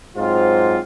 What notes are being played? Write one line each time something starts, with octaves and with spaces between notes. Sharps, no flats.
G#2 F#3 C4 F4